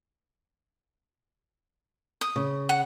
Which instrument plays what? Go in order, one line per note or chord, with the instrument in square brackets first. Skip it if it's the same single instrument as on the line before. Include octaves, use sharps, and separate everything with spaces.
[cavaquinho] D#6
[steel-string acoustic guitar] C#3
[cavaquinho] F#5